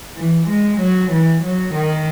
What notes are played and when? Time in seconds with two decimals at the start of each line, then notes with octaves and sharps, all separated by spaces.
0.17 E3
0.49 G#3
0.80 F#3
1.11 E3
1.43 F#3
1.74 D#3